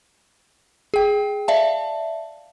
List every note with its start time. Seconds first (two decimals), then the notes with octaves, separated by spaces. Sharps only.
0.94 G#4 G5
1.48 D5 E5 F5 A5